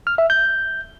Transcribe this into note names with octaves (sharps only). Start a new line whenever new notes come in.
F6
E5
G6